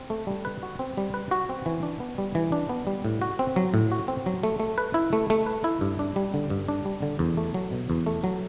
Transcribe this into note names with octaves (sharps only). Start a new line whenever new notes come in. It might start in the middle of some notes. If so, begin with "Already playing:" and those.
Already playing: C4
A3
G3
B4
F#4
C4
G3
B4
F#4
C4
E3
D4
B3
G3
E3
D4
B3
G3
A2
F#4
C4
F#3
A2
F#4
C4
F#3
A3
A3
B4
E4
A3
A3
B4
E4
G2
D4
G3
D3
G2
D4
G3
D3
E2
A3
F#3
B2
E2
A3
F#3